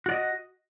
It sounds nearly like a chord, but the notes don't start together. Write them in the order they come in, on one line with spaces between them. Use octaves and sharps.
F#4 D5 D#5